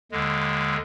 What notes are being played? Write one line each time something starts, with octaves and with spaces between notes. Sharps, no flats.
D#2 D3 G#3